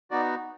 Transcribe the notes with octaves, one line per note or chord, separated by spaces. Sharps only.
B3 D#4 F#4 D5